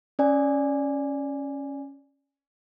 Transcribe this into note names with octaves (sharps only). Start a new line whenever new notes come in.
C#4 D5 G#5